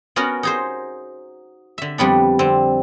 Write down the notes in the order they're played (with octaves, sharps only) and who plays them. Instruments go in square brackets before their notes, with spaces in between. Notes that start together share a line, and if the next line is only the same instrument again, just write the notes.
[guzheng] B3 C#4 F#4 A#4
D#4 G#4 C5
D3 E5
F2 G3 B3 D4
D3 C4